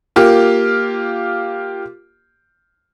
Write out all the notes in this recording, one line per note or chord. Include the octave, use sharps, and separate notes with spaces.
A#3 F4 G4